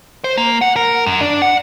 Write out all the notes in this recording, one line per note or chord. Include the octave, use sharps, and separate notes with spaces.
C5
A#3
F#5
A#4
F#2
D4
F#5